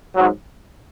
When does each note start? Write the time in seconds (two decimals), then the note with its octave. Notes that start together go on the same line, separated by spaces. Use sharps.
0.15 G#2 F#3